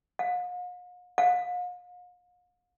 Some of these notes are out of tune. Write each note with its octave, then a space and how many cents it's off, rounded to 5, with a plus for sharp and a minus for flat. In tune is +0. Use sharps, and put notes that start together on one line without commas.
F5 +45
F5 +40